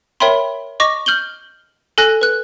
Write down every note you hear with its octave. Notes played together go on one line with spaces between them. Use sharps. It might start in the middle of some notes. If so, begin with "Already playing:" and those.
A#4 C#5 E5 G5 B5 C6
D#5 C#6 D6 A#6
F6 G6 F#7 G7
A4 G#5 F#6 A#6
B4 F#6